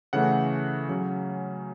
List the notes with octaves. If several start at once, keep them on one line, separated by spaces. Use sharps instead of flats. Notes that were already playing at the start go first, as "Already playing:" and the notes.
C#3 E3 A3 F#5
C#3 F#3 C#4